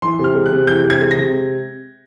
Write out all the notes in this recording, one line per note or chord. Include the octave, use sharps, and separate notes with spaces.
E3 C6
C3 F6
G#3
F#6
C3
E3 G6
C3
G#6
G#3
A#6
C3